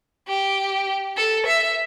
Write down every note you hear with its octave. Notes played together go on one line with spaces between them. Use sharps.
G4
A4
E5